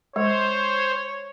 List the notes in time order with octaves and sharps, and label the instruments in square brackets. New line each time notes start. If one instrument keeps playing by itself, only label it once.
[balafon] G#3 [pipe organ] C5 [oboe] C#5